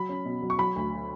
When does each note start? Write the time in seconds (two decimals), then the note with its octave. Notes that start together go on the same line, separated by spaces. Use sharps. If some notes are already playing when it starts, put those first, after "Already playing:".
Already playing: F#3 B5
0.09 C#4
0.25 B2
0.42 F#3
0.50 C#6
0.58 F#3 B5
0.76 D2